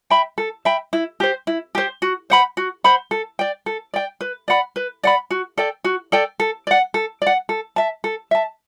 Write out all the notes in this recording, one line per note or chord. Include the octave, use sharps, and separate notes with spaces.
E5 G5 B5
A4
E5 G5 B5
E4
G4 C5
E4
G4 C5
F#4
C5 F#5 B5
F#4
C5 F#5 B5
A4
D5 G5
A4
D5 G5
B4
D5 F#5 B5
B4
D5 F#5 B5
F#4
A4 D5 G5
F#4
A4 D5 G5
A4
D5 F#5
A4
D5 F#5
A4
E5 A5
A4
E5 A5